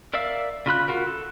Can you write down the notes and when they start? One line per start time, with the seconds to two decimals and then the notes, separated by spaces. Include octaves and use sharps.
0.14 A#4 D5 E5 F5 E6
0.66 C#3 F4 B5 F#6
0.88 F4 F#4 A#4
1.07 A4